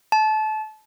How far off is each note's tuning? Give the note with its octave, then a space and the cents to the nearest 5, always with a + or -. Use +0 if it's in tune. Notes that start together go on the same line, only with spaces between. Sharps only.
A5 -25